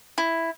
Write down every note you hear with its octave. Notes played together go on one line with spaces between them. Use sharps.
E4